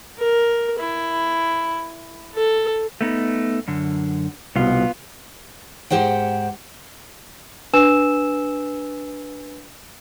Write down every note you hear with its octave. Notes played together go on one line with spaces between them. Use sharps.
A#4
E4
A4
A3 B3 D#4
F#2 D3
C2 B2 B3 F4
G#2 G4 C5 F#5 G5
D4 B4 G#5 E6 E7